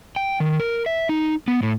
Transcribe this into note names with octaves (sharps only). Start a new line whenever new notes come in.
G5
D#3
A#4
E5
D#4
B3
A2